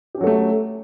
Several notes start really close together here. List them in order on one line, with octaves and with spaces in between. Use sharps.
G4 C#4 F#3 A4 A3